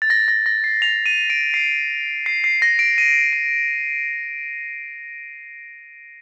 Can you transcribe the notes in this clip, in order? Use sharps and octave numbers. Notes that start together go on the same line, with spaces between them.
A6
A#6
A#6
A#6
C7
F7
D#7
D7
C7
C7
C7
A#6
D7
D#7
D#7